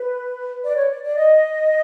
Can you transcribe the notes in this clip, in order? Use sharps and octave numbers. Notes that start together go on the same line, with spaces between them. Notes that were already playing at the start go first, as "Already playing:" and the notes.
Already playing: B4
D5
C#5
D5
D5
D#5